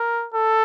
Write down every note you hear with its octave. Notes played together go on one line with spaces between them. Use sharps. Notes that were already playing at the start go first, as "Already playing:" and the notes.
Already playing: A#4
A4